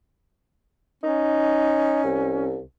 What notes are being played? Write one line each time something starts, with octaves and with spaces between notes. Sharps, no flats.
C#4 D#4
C2